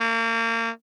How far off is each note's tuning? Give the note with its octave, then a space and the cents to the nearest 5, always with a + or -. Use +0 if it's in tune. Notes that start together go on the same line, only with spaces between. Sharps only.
A#3 -35